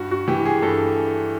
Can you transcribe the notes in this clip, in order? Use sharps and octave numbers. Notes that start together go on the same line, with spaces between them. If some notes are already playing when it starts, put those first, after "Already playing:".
Already playing: G2 F#4
F#4
E3 G4
G#4
G2 A4